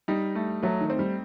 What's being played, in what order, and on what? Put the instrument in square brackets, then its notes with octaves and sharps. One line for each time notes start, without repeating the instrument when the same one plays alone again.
[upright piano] G3 [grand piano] D#4
[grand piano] A3
[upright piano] F#3 [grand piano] A3
[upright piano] D#3
[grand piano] C4
[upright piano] G3